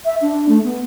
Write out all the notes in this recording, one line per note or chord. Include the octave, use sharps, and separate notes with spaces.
E5
D4
A3
B3